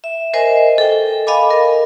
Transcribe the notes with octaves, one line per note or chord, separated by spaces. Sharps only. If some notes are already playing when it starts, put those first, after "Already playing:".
E5
A#4 C5 D#5 E5 G#5
A4 G5
A4 D#5 F5 G#5 B5 D6
A#4